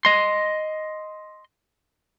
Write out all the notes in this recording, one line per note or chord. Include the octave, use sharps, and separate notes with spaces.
D#5 C6